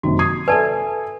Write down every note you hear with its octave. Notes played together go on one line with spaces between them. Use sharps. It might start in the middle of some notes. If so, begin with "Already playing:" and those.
F#1 C3 D#3 F#4
D#6 G#6 C7
A4 B4 D5 E5 G#5 A5